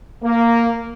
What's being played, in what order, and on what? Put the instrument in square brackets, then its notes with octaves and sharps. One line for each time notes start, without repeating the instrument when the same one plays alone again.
[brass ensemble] A#3